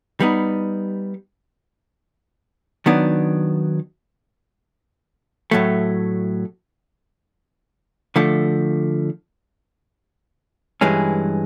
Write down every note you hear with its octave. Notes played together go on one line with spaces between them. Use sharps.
G3 B3 D#4
D#3 F#3 B3 D4
A2 F#3 A3
D3 F3 A3
G2 E3 G#3 C#4